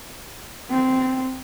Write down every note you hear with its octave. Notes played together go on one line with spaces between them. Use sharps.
C4